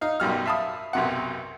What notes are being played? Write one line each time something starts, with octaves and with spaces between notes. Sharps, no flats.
D#4 F5
B1 F#2 G3 F6
E5 F5 A5 B5 D#6
B1 F#2 C3 F#5